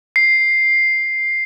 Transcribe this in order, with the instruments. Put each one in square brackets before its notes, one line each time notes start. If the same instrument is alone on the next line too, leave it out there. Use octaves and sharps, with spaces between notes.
[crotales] C7